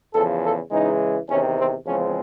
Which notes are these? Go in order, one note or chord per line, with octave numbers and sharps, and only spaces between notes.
E2 C#3 F3 A4
A4
C#3 E3 G#3 D#4
E2 C3 D#3 C#4
C4
E2 C#3 F3 G#3 C4 C#4